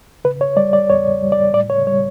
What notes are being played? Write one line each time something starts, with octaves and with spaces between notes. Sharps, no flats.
C#3 B4
C#5
G3 D5
D5
E2 C#5
G3
D5
A2 D5
C#5
G3 C#5